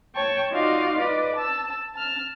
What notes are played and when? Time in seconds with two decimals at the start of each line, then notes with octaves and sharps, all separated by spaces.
0.14 C#5 G5 A5 C#6
0.51 D#4 F4 F#4 D5 D#5 F5
0.98 B4 D5 D#5
1.35 A5 E6
1.93 A5 F6